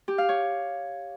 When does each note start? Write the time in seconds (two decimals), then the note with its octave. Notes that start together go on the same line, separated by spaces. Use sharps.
0.08 G4
0.18 F5
0.29 C#5